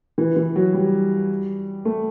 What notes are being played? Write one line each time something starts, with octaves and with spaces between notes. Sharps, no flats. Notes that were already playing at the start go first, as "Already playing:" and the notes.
E3
E3
F#3
G3
A3